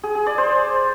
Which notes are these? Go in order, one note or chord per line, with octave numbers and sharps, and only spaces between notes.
G#4
G#4
D5
C5